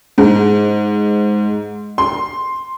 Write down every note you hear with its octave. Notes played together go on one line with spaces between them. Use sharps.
G#2
C6